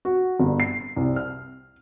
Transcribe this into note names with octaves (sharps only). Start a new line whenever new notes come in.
F#4
G1
C7
C2
F6